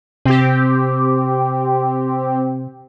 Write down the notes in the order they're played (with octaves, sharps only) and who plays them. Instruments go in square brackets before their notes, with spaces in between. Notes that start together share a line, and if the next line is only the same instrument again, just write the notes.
[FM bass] C3 [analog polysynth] C4 G4